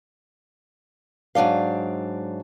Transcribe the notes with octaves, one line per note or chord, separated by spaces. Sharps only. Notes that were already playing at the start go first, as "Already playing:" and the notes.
G#2 D3 F#3 D4 F5